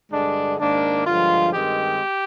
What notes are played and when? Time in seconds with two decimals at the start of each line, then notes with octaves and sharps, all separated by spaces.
0.11 G2 D3 G#3 D4
0.59 G#2 D#3 A#3 D4
1.06 G2 D3 F3 G#3 F4
1.53 G2 D#3 G#3 C4 G4